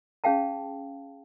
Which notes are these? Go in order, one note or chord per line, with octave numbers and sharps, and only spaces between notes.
C#4 G#4 F5 G5 A5